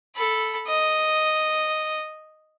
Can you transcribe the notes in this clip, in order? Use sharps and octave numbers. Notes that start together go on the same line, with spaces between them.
A4 B5
D#5